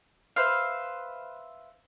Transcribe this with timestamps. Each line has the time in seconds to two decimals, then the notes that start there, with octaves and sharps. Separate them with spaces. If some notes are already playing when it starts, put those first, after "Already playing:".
0.36 B4 C5 E5 F5